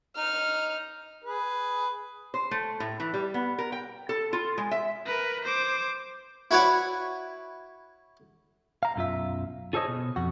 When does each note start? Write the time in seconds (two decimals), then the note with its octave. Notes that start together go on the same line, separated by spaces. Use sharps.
0.17 D#4 F6
1.24 G#4 B4
2.34 C5
2.51 A3
2.80 A2
3.00 E3
3.14 G3
3.34 B3
3.59 A#4
3.72 G5
4.09 A4
4.33 F4
4.58 G#3
4.71 E5
5.06 A#4 B4
5.45 C5 D6
6.51 E4 F#4 B4 C#5 D5 F#5
8.83 F5 A#5
8.96 B1 F#2 F4 E5
9.73 F4 G#4 A4 C5 C#5 D#5
9.88 B2
10.16 F2 F#4